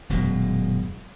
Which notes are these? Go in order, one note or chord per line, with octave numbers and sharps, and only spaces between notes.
D#1 F#2 B2 G#3